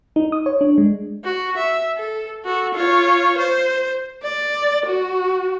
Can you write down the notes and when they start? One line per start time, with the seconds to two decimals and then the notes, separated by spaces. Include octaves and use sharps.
0.16 D#4
0.32 D#6
0.46 C#5
0.61 D4
0.78 G#3
1.24 F#4
1.57 E5
1.97 A4
2.45 F#4 A4
2.74 F4 C#5
3.37 C5
4.23 D5
4.86 F#4